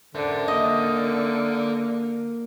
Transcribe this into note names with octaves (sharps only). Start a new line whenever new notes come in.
D3 A#4 C5 E5 A5
A#3 D#5